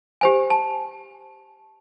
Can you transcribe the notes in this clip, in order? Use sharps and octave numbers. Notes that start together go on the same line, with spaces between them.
G4 C5 G#5
A5